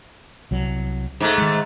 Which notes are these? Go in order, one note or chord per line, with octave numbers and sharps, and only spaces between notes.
C2 F#3
G#2 A3
D#3 G#3